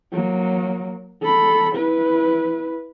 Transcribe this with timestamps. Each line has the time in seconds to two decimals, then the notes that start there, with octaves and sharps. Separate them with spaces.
0.13 F#3 A#3
1.22 A4 B5
1.75 E4 B4